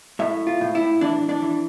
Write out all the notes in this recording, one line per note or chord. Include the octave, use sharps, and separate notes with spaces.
A2 E5
F4
A2
E4
E3 D4
D4
E3